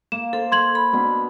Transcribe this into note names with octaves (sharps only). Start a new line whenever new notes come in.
A#3 E7
A4 C5
C6 G#6 F#7
B5
B2 B3 D4